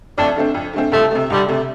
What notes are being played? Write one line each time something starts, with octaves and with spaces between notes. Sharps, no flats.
F2 A3 D4
D3 A3 C4
F2
D3 A3 C4
C2 F3 A3
C3 A3
C2 D3 G3
C3 A3